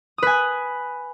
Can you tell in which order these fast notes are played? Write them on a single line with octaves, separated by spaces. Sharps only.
D#6 B4 G#5